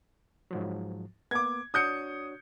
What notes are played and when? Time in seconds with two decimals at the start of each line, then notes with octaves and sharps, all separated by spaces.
0.51 G#2 F3 F#3
1.31 A#3 B3 D6 G#6
1.74 D4 F#4 C#5 D#6 G6 C#7